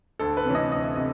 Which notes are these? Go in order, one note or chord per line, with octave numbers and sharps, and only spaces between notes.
D2 A4
B4
C3 E3 A3 C#4
D#5
D2 D#5
E5
C3 D#5